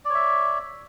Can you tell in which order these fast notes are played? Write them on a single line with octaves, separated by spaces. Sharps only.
D5 C#5 E5